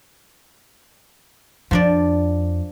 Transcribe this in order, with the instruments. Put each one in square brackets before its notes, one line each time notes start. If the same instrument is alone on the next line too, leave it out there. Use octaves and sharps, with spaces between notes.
[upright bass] F2 [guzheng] F3 D4 D5